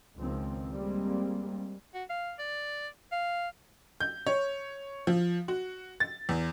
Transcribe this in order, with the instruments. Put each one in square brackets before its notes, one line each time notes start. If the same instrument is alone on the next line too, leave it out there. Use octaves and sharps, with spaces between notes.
[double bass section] C#2 D#3 F3 C4
G3 G#3 A#3 C4
[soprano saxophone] F#4
F5
D5
F5
[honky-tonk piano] G6
C#5
F3
F#4
A6
E2